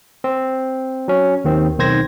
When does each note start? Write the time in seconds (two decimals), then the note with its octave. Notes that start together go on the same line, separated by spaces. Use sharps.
0.24 C4
1.08 F#3 C#4
1.44 D#2 D#3 C4
1.78 B1 D#3 C4 C5 G#6 A#6